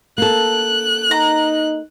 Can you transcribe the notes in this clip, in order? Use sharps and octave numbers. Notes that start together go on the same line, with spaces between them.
A#3 A4 F#6
D#4 A#5